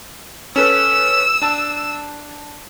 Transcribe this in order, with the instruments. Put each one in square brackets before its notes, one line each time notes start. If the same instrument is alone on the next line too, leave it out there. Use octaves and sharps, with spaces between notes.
[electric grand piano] C#4 A4 B4 [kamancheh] E6
[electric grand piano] D4 A5